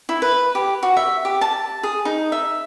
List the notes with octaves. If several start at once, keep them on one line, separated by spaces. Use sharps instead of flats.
E4
B4
G4
F#4
E5
G4
A5
G#4
D#4
E5